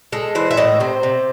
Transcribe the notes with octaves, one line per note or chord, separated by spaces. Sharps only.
G#3 A4
E3 C5
E5
A2 D#5
C3 C5
C3